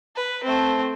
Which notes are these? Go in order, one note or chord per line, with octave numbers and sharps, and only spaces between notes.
B4
A3 C4